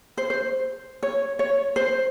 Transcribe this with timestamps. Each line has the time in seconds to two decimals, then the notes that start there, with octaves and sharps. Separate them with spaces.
0.17 C5
0.30 C5
1.03 C#5
1.39 C#5
1.76 C5